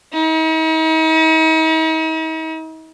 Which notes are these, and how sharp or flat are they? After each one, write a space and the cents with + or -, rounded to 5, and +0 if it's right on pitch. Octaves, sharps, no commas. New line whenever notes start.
D#4 +45